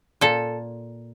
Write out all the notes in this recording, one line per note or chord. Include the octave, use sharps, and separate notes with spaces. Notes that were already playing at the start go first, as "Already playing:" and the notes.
A#2 A4